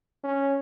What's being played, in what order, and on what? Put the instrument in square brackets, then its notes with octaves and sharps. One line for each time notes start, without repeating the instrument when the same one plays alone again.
[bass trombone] C#4